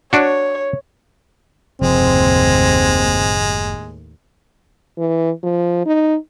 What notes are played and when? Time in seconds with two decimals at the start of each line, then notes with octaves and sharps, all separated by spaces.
0.13 D4 F#4 C#5
1.82 F#1 D#2 A2 C3 F3 G#3 C4
4.98 E3
5.43 F3
5.86 D#4